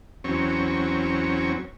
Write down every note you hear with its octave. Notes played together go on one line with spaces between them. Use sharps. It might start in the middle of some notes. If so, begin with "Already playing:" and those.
E2 F#3 C4 C#4 C#6